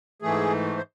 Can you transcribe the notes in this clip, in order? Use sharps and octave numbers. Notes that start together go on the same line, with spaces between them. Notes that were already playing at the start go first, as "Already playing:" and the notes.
G#2 E3 A3 G#4
C5